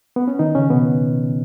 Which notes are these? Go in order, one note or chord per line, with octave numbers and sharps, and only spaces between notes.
B3
C#4
D#3 D#4
C#3 C#4
B2 B3